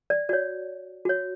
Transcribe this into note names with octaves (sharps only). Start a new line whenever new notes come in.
D5
F#4 C#5 D5
F#4 C#5